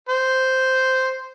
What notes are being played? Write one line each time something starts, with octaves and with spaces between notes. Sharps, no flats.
C5